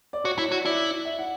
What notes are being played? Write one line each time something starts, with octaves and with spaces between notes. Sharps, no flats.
D5
F#4 C#5
E4
F#4
E4 D5
E5
F#5